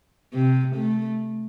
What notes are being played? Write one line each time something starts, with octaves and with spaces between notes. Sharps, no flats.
C3
A3